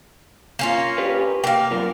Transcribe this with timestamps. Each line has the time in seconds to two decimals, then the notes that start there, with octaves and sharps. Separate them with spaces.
0.59 A#3 C#4 F4
0.98 G4 B4
1.44 A#3 F5 G5
1.71 F#2 F4 A#4